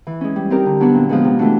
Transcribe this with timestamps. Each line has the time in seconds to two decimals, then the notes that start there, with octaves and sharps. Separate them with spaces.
0.07 E3
0.21 G#3 C#4
0.36 G3
0.50 C4 D#4 G4 A#4
0.66 D3
0.80 F#3 B3 D4 F#4
0.95 A#2
1.09 F3 G#3 B3
1.24 C3
1.39 E3 A3 D4 F#4